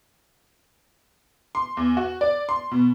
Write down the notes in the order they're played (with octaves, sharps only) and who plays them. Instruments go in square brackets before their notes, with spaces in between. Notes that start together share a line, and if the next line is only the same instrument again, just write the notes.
[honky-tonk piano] C6
E2
F#4
D5
C6
B2